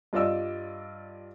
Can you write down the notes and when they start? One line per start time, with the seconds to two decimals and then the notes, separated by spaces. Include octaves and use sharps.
0.13 G2 F4 D5 D#5 E6